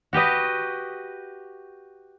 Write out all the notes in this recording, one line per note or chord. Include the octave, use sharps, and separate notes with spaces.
F#4 G4 B4 D#5